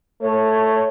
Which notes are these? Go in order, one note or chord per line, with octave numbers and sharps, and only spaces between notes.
A3 C#5